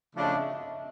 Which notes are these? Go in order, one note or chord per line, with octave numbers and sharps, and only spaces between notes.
C#3 F3 A3 D4
D#5
E5